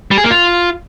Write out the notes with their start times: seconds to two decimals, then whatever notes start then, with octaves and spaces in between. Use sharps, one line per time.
0.11 G3
0.18 G#4
0.24 A#3
0.31 F4